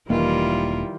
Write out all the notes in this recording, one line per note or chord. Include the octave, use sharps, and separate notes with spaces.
E1 D#3 E3 G3 A#3 E4 F4 A#4